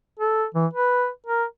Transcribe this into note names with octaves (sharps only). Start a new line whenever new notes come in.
A4
E3
B4
A#4